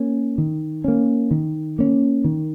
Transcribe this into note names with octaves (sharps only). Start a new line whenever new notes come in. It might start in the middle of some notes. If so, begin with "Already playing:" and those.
Already playing: A#3 C#4
D#3
A#3 C#4
D#3
A#3 C#4
D#3